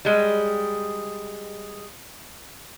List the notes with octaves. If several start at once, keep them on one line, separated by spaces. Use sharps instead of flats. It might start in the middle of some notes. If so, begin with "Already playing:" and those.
G3 G#3